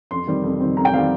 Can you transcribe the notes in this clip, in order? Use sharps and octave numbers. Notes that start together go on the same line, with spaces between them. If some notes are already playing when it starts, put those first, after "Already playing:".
F2 C6
D#3 G3 C4
F2
D#3 G3 C4
F2 A#5
G5
D#3 G3 C4 F5